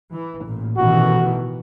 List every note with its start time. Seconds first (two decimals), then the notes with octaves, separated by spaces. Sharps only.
0.13 E3
0.45 A1 A#2
0.77 A1 B2 D#3 E3 F#4